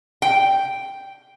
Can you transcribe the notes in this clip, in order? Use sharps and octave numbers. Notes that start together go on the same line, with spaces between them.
G5